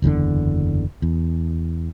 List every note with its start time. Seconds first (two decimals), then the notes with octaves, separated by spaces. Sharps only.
0.02 F#1 E2 B2 D3
1.02 E2